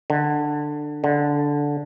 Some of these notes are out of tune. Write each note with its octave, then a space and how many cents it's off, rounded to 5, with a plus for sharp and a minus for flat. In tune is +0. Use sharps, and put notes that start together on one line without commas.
D3 +15
D3 -10